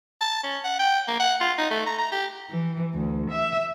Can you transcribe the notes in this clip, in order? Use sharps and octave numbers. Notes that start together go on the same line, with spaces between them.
A5
C#4
F#5
G5
A#3
F#5
F4
D#4
A3
A#5
A#5
G4
E3
D2
E5